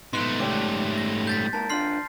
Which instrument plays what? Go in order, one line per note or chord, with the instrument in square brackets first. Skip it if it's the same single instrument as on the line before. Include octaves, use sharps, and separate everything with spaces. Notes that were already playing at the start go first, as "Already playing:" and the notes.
[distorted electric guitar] G#2 A3 [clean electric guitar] B2 B3 [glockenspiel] C6 F#6
[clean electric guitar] C#4 G4 D5 [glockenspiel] D6
[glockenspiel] A#6
G6 A6 B6
[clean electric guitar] G#2 A#3 A#4 [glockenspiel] A5
[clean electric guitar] D3 D4 F4 [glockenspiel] C6 F6 C7